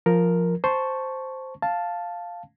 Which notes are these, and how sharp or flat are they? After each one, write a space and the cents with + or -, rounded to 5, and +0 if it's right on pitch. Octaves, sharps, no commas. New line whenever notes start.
F3 +0 A#4 +0
C5 +0 A5 +0 C#6 +0
F5 +0 A5 +0